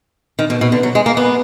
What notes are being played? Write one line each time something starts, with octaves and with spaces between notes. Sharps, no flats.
D#3
B2
B2
D3
F#3
G#3
A#3
B3